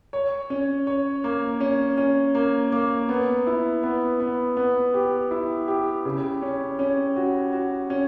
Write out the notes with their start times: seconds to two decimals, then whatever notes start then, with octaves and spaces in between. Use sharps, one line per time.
0.13 C#5
0.50 C#4
0.87 C#5
1.24 A#3
1.60 C#4
1.98 C#4
2.35 A#3
2.72 A#3
3.09 B3
3.47 E4
3.83 B3
4.20 B3
4.57 B3
4.94 G4
5.31 E4
5.68 G4
6.05 C#3
6.42 C#4
6.79 C#4
7.17 F#4
7.53 F#4
7.90 C#4